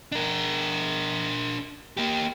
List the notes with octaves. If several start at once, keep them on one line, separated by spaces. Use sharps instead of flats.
D4 A#4
A#3 G4